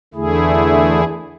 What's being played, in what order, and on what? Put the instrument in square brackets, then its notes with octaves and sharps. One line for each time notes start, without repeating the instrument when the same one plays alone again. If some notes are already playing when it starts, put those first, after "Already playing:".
[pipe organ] E2 D3 A3 E4 G#4